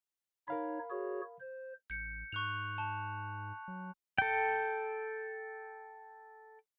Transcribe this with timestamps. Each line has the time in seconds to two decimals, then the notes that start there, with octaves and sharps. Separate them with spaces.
0.48 D#4 A#4 C#5 F5 B5
0.90 F#4 G#4 C#5
1.41 C5
1.90 A1 G6 C#7
2.32 G#2 C#6 F#6 F7
2.78 A5
3.68 F#3
4.18 A4 G5